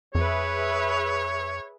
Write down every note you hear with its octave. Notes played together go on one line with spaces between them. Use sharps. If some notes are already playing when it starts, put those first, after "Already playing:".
F2 G#4 B4 C#5 E5